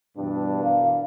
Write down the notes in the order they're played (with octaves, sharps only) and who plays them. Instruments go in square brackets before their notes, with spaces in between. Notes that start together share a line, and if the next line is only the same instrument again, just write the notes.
[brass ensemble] G2 [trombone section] B2 E3 D4
[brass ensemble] A#4 F5